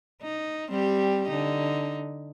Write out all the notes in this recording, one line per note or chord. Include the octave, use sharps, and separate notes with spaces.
D#4
G3 C4 G4
D3 D#4